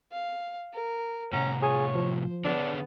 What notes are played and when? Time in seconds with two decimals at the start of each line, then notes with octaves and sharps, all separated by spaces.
0.12 F5
0.73 A#4
1.33 A2 C3 C#4 F#5 A#5
1.62 F4 G#4 C#5 G#5
1.95 F3 C5
2.45 D3 B3 D4 G#4 C#5